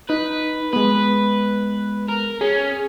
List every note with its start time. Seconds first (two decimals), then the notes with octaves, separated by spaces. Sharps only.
0.10 D#4 B4
0.73 G#3 B3 B4
2.09 A#4
2.41 C#4 G#4